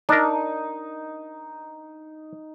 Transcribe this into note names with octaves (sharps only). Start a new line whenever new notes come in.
D4 D#4 A#4